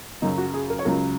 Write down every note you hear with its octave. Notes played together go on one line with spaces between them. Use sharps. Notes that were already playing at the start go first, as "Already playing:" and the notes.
F#2 C#3 F#3 D#4
F#4
G#4
A#4
C#5
C#2 C#3 F#3 A#4